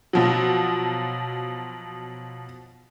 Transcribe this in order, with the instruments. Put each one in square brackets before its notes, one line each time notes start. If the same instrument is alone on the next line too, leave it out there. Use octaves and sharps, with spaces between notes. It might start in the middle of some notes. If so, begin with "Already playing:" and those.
[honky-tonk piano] B2 F3 F#3